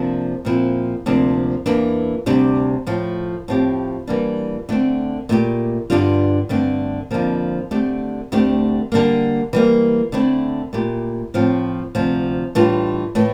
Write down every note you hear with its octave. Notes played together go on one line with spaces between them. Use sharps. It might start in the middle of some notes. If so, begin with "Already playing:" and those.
Already playing: C3 F3 A#3 D4
A#2 F3 C4 E4
D2 C3 F3 A#3 D4
E2 E3 A#3 D4
D2 C3 G3 D4 G4
A2 F3 A3
A2 F3 C4 E4 G4
E3 G3 A#3 D4
D3 A3 C4
A#2 A3 E4 G4
G2 D3 G3 D4 F4
G2 D3 A3 C4
F2 D3 F3 A#3
D3 A3 C4 G4
D2 D3 A3 C4 G4
D3 G3 A#3
E3 G3 A#3
D3 A3 C4 E4
A#2 A3 E4 G4
A2 F3 C4 F4
D2 C3 F3
A2 E3 G3 D4 F4
A2 E3 A3